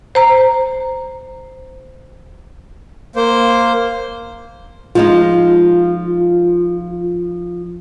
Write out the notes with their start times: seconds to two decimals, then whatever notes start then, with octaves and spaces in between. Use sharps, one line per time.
0.15 C5 A#5
3.16 A#3 C5
4.95 F3 G#3 D#4 F4